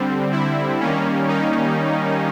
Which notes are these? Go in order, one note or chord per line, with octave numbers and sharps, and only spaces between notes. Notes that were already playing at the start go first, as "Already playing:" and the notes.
Already playing: D3 G3 C4
E4
D#3 G3 A#3 C#4
D#4